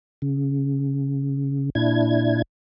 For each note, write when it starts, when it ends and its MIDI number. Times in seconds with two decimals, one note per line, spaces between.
0.22 1.70 49
1.75 2.42 46
1.75 2.42 62
1.75 2.42 64
1.75 2.42 92